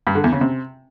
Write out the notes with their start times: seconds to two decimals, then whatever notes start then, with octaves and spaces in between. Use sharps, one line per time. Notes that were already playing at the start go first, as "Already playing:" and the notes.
0.07 G2
0.15 D3
0.24 E2
0.32 C#3
0.41 C3